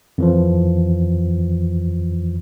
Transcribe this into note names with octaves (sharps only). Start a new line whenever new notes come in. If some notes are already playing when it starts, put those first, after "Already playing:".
F2 E3 F3